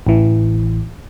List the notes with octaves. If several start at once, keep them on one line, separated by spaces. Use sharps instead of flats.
A1 E3